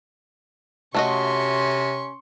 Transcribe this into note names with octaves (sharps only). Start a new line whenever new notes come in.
C3 A3 C#4 F#4 D#5 C6 C#6